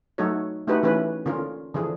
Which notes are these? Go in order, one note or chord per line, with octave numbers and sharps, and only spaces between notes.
F#3 A3 D#4 F#4 A4 C#5
A3 D4 D#4 F#4 G4 B4
E3 A3 C#4 B4
D3 C#4 F4 A#4
D3 E3 F3 D4 G#4